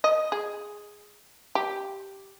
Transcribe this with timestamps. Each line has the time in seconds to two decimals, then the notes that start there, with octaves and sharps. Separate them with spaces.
0.04 D#5
0.32 G#4
1.55 G4